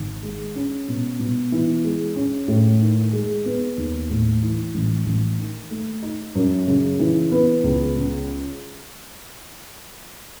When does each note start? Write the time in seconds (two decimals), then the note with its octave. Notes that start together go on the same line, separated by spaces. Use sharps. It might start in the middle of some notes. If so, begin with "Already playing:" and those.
Already playing: G#1
0.23 G#3
0.56 C#4
0.88 B2
1.19 B2
1.52 E3
1.84 G#3
2.16 C#4
2.48 A2
2.81 D#3
3.13 G#3
3.46 B3
3.77 D#2
4.10 A2
4.42 E3
4.74 A1
5.06 A1
5.39 D#3
5.70 A3
6.02 D#4
6.35 F#2
6.67 C#3
6.99 E3
7.32 B3
7.64 C#2
7.96 C#3